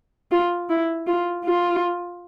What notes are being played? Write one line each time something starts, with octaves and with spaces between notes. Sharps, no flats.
F4
E4
F4
F4